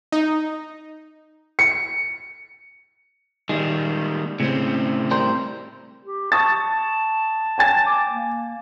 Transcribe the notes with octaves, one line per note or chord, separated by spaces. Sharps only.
D#4
C#7
D#3 G3 G#3
A2 C#3 C4
G3 A#4 C5
G4
A5 C#6 D#6 A6
G5 G#5 A6
D6
A#3